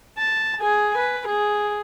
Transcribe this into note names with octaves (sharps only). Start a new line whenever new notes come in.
A5
G#4 G#5
B4
G#4